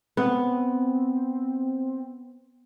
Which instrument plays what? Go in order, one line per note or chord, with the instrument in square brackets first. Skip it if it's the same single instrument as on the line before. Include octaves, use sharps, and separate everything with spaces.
[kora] B3 [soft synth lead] C4